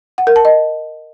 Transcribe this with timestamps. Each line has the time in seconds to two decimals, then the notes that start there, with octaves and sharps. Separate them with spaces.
0.18 F#5
0.27 A#4
0.36 A5
0.45 D#5